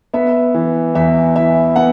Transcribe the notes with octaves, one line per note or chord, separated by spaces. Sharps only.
B3 E5
E3
E2 E5
E4 E5
B3 F#5